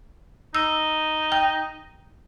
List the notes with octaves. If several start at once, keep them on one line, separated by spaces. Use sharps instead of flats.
D#4 E6
G5